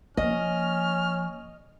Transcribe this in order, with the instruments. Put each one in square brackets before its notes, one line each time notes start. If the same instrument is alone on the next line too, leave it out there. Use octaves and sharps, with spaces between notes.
[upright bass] F3 A#3 [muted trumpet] C#4 [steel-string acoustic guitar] D#5 [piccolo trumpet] F6